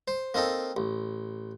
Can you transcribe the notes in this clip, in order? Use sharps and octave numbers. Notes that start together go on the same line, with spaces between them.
C5
A#3 C4 D#4 A4
A1